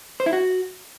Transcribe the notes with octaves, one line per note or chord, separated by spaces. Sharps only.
C5
E4
F#4